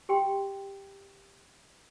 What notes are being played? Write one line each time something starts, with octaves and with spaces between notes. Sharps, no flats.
G4 G5 C6